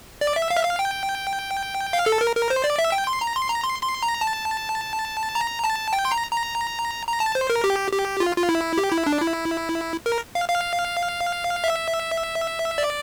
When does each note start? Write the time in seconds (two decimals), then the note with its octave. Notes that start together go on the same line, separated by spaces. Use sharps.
0.21 D5
0.36 E5
0.50 F5
0.56 E5
0.64 F5
0.79 G5
1.93 F5
2.06 A4
2.21 A#4
2.36 A#4
2.50 C5
2.64 D5
2.79 E5
2.92 G5
3.07 C6
3.21 A#5
3.36 C6
3.49 A#5
3.64 C6
3.83 C6
4.03 A#5
4.21 A5
5.35 A#5
5.64 A5
5.93 G5
6.05 C6
6.12 A#5
6.31 A#5
7.07 A#5
7.20 A5
7.35 C5
7.50 A#4
7.64 G4
7.93 G4
8.20 F4
8.37 F4
8.49 E4
8.78 G4
8.92 E4
9.06 D4
9.21 E4
10.06 A#4
10.35 F5
10.49 F5
11.64 E5
12.78 D5